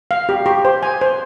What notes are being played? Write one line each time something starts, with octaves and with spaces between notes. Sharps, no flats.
F5
G4
G4
C5
G#5
C5